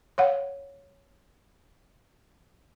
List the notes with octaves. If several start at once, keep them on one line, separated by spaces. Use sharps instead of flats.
C#5 F5 F#5